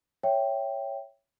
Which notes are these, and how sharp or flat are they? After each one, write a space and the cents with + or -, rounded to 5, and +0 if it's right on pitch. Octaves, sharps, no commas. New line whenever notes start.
C#5 +0 E5 +10 G5 +0